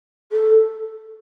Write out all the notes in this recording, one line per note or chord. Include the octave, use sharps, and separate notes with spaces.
A4